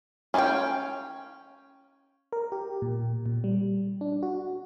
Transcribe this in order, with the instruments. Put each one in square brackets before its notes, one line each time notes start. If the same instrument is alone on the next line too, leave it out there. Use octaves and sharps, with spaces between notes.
[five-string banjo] C#4 E4 F4 F5 G5
[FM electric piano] A#4
G4
A#2
A#2
G3
D4
F#4